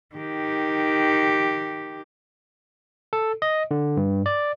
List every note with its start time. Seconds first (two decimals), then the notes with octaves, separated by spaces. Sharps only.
0.16 D#3 G4
3.13 A4
3.42 D#5
3.71 D3
3.97 G2
4.26 D5